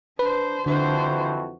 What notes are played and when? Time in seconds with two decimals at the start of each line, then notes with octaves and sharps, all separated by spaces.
0.19 D4 B4 C5
0.66 F2 D3 E3 D4 F#4 C5